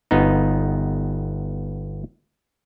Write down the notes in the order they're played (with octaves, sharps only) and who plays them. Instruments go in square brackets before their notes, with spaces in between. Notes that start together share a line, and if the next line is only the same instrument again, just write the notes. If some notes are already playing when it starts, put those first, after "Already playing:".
[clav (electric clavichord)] G1 B3 D#4